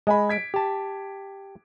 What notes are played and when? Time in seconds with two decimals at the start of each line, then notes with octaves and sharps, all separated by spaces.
0.07 G#3 D#5 G#5 B5
0.29 G#6 B6 D7
0.54 G4 A5